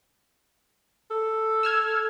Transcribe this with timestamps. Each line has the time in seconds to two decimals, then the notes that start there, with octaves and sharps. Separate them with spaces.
1.11 A4
1.63 E6 F6 G#6